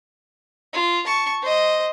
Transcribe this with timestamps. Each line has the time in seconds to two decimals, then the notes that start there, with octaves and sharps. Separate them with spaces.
0.73 F4
1.06 A5 C#6
1.42 C5 D#5